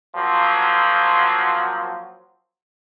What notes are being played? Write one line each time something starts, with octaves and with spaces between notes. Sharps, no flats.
F3 F#3 A#3 C4 F4